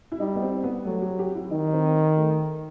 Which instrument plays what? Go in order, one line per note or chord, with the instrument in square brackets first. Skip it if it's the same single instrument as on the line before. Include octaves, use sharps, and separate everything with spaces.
[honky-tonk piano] E4
[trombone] G3 [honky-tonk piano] D#4
[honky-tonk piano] B3
C4
B3
[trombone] F#3 [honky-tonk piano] A3
[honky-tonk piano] G4
G4
E4
[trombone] D#3 [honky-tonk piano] D#4
[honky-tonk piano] C4
A3